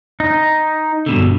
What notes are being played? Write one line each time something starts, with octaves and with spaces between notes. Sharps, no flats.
D#4
G2 B2 D3